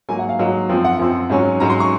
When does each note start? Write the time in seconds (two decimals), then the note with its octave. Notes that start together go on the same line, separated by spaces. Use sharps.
0.09 G#2 F#3 A#3 G#5
0.19 F#5
0.29 F5
0.39 G#2 F#3 A#3 D#5
0.69 F#2 F3 C4
0.84 F#5
0.99 F#2 F3 C4
1.30 G#2 F#3 C#4
1.60 G#2 F#3 C#4 A#5
1.70 C6
1.80 C#6